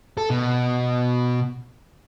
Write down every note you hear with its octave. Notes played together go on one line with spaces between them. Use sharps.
A4
B2